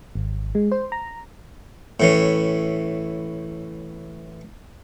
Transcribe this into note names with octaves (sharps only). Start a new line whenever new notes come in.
G#1
G#3
C5
A#5
A2 E3 C#4